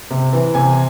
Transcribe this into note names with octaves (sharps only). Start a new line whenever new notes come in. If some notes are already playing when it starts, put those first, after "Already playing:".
C3
E3
C3 G#5